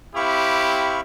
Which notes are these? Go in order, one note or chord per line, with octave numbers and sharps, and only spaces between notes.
C4 E4 G4 F5 B5 C#6